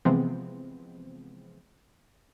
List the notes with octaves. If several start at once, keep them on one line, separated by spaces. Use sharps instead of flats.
C3 E3 F3 G#3 B3 C4